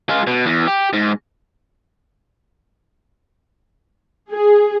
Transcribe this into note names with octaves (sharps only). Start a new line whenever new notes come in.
G#3 F4
B2
E2
G4
G#2
G#4